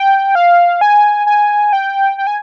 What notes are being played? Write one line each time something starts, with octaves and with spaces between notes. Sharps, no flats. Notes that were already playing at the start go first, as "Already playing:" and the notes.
Already playing: G5
F5
G#5
G#5
G5
G5
G#5